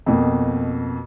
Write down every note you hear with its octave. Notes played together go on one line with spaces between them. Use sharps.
F2 B2 A#3